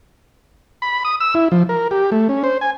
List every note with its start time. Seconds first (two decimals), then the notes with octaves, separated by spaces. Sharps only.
0.82 B5
1.05 D#6
1.21 E6
1.35 E4
1.52 F3
1.69 A#4
1.91 G4
2.12 A3
2.29 C#4
2.44 C5
2.61 G#5